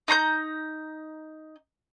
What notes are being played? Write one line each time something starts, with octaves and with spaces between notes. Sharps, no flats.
D#4 A#5 C6 G6